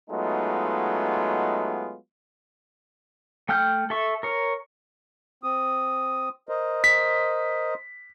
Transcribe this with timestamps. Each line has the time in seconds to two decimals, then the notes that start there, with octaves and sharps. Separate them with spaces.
0.10 F#3 G#3 A3 B3 D#4 F4
3.49 A3 G5 F6 G6
3.90 A4 E5 C#6
4.23 A#4 C#5
5.43 C4 D#6
6.49 A#4 C5 D#5
6.84 B6